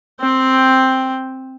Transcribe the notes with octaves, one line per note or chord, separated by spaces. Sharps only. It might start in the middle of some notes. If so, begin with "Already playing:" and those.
C4 G5